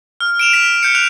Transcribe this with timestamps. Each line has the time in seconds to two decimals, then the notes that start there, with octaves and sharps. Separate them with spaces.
0.20 F6
0.39 D7 E7 F7
0.53 B6
0.83 G6 C#7
0.95 F#6 F7